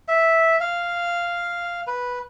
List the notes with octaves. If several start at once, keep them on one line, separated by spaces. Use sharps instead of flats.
E5
F5
B4